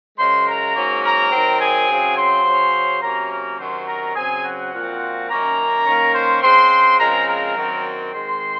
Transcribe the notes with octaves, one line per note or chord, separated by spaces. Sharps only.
F#2 C#3 G#3 C5 C6
A#4 A#5
G#2 F#3 A#3 C#4
A#4 A#5
D#3 F#3 C4
G#4 G#5
C#3 F#3 C4
C5 C6
C#3 F#3 C#4
C3 F#3 A#3 C#4 A#4 A#5
A#4 A#5
C3 D#3 F#3 C#4 C5 C6
A#4 A#5
C#3 F#3 C4 G#4 G#5
F#4 F#5
A#2 F3 C4
F#2 D#3 A#3 C#4 A#4 A#5
D#3 A#3 C#4
C5 C6
C#3 G#3 C4 C5 C6
C#3 F3 G#3 C4 A#4 A#5
A#4 A#5
F#2 D#3 F#3 C4
G#2 D#3 G#3 C4 C5 C6